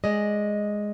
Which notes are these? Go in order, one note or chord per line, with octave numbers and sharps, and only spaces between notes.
G#3 D5 D#5